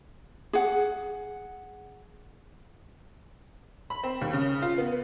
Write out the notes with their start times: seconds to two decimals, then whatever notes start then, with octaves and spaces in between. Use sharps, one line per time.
0.53 G#4 F#5
3.90 B5
4.03 C4
4.21 D#2
4.33 C#3
4.62 F4
4.78 B3